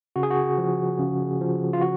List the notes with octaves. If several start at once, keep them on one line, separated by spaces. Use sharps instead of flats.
C#3 F#4
G#4
F#4
F3
C#3
F3
F4
F#4